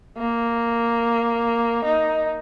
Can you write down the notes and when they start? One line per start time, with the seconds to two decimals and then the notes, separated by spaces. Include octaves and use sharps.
0.18 A#3
1.85 D#4